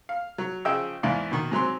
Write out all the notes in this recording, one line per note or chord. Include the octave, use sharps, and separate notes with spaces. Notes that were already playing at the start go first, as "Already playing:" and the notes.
F5
F#3
C#3 F3 G#4 D#5 G5 E6
E2 G#2 E4 D5 F5
B2 D#3
G#2 F#3 C4 C6